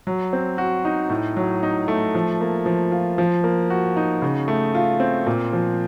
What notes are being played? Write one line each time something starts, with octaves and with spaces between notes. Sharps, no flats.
F#3
C4
F#4
D#4
A2
F#3
D#4
A3
F3
A#3
F3
F4
F3
A#3
F#4
D#4
C#3
A3
F4
C4
A#2
F3